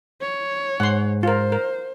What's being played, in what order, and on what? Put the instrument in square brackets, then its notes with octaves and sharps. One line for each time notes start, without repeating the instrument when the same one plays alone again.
[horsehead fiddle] C#5
[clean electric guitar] G#2 [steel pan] F#5 C6
[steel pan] F4 A#4 [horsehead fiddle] C5
[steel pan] A#4